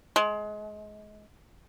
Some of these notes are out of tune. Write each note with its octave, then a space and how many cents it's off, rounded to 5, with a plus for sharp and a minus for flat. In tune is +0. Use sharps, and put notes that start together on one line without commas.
G#3 +25